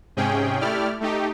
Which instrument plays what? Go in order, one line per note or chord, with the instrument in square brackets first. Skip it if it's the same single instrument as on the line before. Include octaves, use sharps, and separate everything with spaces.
[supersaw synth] G#2 C3 C#4 G#4 G5
A3 E4 G4 D5 F6
A3 D#4 G4